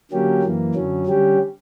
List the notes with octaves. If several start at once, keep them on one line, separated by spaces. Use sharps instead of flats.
D3 F#3 A#3 C#4 G4
F#2 E3 A#3
F#2 D3 F#3 C#4
D3 G3 C#4 G4